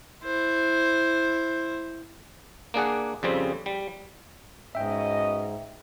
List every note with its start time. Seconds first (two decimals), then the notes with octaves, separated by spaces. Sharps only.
0.23 E4 C5
2.74 A#3 D4 G#4 F#5
3.23 F2 C#3 G3 C4
3.66 G3
4.75 G#2 B2 C#4 D#5 E5 G5